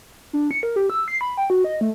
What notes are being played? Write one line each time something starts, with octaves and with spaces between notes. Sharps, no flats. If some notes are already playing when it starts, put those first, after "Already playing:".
D4
C#7
A#4
G4
E6
C7
B5
G5
F#4
D#5
A3